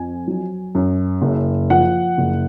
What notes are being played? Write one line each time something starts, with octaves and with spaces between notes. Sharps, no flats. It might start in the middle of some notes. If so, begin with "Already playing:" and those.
Already playing: F2 G#5
F#3
F#2
F#1
F3 F#5
F#1